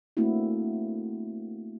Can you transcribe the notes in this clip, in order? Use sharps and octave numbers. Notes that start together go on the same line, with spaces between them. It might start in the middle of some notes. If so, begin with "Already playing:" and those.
A3 A#3 C4 D4 E4 F#4